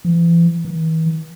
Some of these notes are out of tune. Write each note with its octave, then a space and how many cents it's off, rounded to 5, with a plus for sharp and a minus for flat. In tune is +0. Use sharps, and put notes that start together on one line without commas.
E3 +40
E3 -45